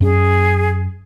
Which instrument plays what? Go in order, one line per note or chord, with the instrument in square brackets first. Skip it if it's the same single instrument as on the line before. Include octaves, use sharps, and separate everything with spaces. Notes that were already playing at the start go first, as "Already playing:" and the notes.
[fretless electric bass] F#2 C#4 [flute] G#4